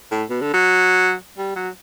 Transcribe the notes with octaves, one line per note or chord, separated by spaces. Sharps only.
A2
B2
D3
F#3
G3
F#3